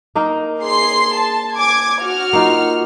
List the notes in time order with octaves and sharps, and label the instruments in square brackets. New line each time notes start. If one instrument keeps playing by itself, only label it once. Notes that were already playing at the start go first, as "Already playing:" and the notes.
[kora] A#3 D#4 A#4
[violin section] G#4 C6 C7
A5
G#5 D6 G#6
F#4 F#5 F6
[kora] A#3 D#4 F4